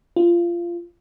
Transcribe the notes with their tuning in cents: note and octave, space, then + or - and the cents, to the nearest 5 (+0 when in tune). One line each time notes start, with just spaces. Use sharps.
F4 -20